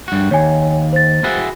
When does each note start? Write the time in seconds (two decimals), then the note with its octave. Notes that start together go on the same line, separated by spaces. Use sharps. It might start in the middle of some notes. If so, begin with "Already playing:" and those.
0.08 G2 F#4
0.31 D#2 C#5 G#5
0.93 C5 A6
1.24 E4 F#4 G#4